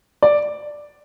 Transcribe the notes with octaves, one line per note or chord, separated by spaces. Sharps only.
D5